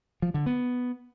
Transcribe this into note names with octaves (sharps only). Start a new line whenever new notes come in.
F3
D3
B3